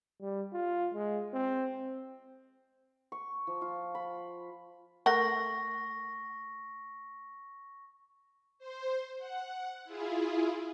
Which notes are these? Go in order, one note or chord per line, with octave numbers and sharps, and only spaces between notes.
G3
F4
G#3
C4
C#6
F3
F4
B5
A3 A#4 F#5 C#6 A#6
C5
F#5
E4 F4 G#4